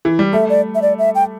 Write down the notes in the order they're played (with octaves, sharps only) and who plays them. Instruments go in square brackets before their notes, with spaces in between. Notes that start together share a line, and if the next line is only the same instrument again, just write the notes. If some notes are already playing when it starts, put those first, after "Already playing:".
[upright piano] E3
G3
[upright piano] A3 [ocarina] E5
[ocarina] D5
E5
D5
E5
G5